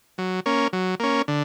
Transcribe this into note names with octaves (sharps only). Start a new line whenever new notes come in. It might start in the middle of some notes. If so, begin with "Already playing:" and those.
F#3
A#3 C#4
F#3
A#3 C#4
D3